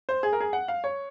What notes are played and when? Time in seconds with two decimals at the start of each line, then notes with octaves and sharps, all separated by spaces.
0.09 C5
0.23 G#4
0.33 A#4
0.40 G#4
0.53 F#5
0.68 F5
0.84 C#5